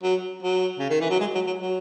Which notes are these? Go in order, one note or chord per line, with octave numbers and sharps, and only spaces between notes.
F#3
F#3
C#3
D#3
E3
F#3
G#3
F#3
F#3
F#3